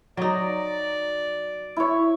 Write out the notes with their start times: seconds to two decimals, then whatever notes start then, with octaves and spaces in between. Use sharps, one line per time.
0.17 F#3 D#4 D5
1.76 E4 C#5